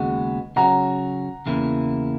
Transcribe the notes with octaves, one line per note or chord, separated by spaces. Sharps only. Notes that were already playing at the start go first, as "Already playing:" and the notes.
Already playing: D#2 C#3 G#3 B3 F#4
C#3 F#3 C#4 F#5 A#5
E2 C#3 E3 A#3 E4